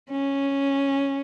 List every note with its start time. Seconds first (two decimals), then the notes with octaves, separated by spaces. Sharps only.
0.11 C#4